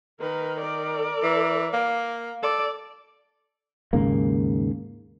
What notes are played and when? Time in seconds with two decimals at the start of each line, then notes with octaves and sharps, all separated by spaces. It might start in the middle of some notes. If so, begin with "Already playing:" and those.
0.21 D#3 A#4 B4
0.61 A#4 D5
1.23 E3
1.73 A#3
2.43 A4 D5
3.93 D#2 G#2 C#3 A#3